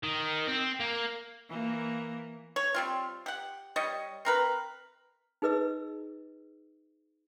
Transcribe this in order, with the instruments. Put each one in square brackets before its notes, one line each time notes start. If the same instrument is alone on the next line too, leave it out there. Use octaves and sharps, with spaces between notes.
[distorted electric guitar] D#3
C4
A#3
[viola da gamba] E3 A#3
[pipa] C#5
G3 C4 F4
G4 F#5
G3 C#5 D#5
C4 A#4 B4
[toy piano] D#4 G#4 B4 D#5 E6